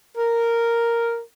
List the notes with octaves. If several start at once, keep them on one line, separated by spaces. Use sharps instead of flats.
A#4